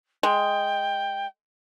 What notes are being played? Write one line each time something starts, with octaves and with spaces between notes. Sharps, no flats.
G#3 G5